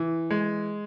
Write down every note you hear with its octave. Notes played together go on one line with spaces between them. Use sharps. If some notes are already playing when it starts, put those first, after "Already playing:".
Already playing: E3
G#3